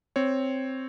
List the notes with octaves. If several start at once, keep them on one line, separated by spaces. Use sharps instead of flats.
C4 C#5